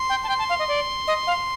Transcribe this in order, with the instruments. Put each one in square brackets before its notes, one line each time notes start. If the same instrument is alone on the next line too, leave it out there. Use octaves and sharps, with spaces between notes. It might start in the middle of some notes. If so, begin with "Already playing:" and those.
Already playing: [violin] C6
[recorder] G5
A5
[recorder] G5 [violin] C6
[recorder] A5
F5
D#5
D5
D#5
F5